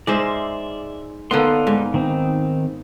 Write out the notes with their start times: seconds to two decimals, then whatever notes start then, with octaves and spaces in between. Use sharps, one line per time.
0.07 G#2 G#3 C5 D5 E5
1.31 D3 A#3 B3 D#4 D5 C6
1.67 G#2
1.94 D#3 C4 D#4